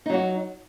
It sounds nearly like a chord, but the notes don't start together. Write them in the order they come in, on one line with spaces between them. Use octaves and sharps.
D#4 F#3 F#4